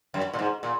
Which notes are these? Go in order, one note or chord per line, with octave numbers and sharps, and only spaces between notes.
F#2
A#2
G#2
A#2